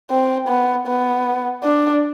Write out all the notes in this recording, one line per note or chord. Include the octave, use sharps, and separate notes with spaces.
C4
B3
B3
D4